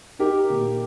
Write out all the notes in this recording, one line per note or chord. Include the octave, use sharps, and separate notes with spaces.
D#4 G4 A#4
A#2